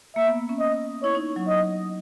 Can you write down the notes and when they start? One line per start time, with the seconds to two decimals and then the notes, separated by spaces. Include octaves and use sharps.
0.16 A#3 E5
0.27 B3
0.49 C#4
0.59 D#5
1.03 E4 C#5
1.15 D#4
1.36 F#3
1.48 D#5